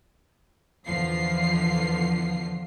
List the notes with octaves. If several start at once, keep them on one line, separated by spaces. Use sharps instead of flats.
E2 D3 F3 F4 C7